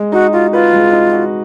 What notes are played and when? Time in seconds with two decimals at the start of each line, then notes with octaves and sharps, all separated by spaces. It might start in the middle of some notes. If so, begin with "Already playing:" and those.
Already playing: G#3
0.12 D#4 F#4
0.33 F4 F#4
0.53 F4 B4
0.73 G#3
0.92 D#4
1.13 F#4